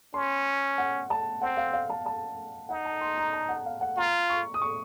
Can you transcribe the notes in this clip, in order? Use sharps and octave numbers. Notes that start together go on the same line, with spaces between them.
C#4 C6
F#5
A5
C4 F#5
F5
F5
A5
A5
D#4 F#5
A5
C6
A#5
A5
F#5
F5
F#5
F4 A#5
C#6
D#6
C#6